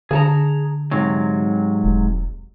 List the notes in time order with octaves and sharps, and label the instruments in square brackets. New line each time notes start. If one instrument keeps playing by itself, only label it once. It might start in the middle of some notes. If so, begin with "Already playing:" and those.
[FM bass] D3 [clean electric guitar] G#4 A5 A#5
[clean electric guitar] G#2 C3 F#3
[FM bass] E1